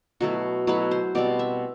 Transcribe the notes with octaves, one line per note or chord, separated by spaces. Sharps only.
B2 F#3 A3 E4 F#4
B2 F#3 A3 E4 B4
C5
B2 G3 C4 D5
E5